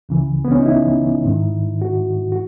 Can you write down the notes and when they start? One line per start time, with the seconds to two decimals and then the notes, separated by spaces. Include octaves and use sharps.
0.09 C#2 C#3 E3
0.45 B3
0.52 C#4
0.60 D#4
0.66 E4
1.24 G#2 D#3
1.82 F#4
2.32 F#4